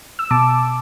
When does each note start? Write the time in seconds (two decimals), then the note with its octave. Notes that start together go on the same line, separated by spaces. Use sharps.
0.19 E6
0.30 B2 A5 D6